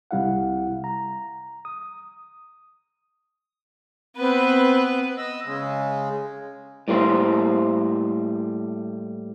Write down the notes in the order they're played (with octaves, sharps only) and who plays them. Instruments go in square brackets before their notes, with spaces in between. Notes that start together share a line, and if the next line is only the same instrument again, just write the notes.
[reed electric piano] C2 C3 G3 E4 F5 F#5
A#5
D#6
[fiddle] B3 B4 [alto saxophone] C4
[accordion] D#5 E6
C#3 G#3
[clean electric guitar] A2 G3 A#3 C5